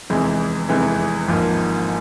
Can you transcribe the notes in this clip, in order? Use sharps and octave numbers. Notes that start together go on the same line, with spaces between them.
F1 E2 C3 E3 G#3
F1 E2 C3 E3 G#3
G#1 G#2 F3 A#3